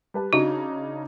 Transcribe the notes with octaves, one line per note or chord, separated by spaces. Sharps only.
G3 B4 A5
C#3 D4 D#4 F#4